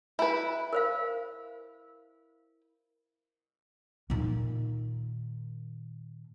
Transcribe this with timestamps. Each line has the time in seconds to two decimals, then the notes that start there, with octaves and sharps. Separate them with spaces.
0.19 E4 B4
0.73 A#4 C5 F5
4.10 A#2 D#3